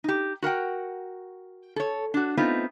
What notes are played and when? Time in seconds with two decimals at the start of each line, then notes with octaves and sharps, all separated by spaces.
0.04 D#4 G4
0.42 F#4 A#4 F#5 G5
1.76 A4 C#5
2.14 D4 F#4
2.37 A3 B3 C4 D#4 F4